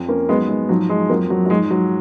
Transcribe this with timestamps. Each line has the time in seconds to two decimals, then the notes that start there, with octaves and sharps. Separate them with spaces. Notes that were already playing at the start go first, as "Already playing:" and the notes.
Already playing: F2 F3
0.08 A#3 C#4
0.28 G#2 F#3 G#3 B3
0.49 G#3
0.69 G#2 F3 F#3
0.89 G#3
1.10 F2 F3 F#3 A#3
1.30 F#3
1.46 F#3
1.50 G#2 F3 G#3
1.71 F#3